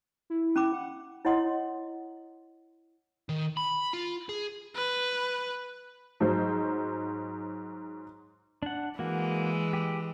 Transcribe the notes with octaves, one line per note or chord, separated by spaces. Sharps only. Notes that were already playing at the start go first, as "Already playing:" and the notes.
E4
C#4 B5 D6
F#5
E4 C#5 D#5 F#5 C6 D#6
D#3
B5
F4
G#4
B4
G#2 F#3 C5
D4 F#5
E3 G#3 A#3 F#4
G4